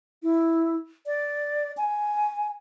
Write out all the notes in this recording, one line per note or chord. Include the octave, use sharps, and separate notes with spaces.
E4
D5
G#5